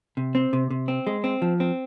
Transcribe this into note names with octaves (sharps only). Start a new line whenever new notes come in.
C3
C4
C3
C3
C4
G#3
C4
F3
C4